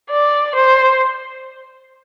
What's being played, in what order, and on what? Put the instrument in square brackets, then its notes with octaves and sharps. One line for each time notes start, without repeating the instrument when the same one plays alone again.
[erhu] D5
C5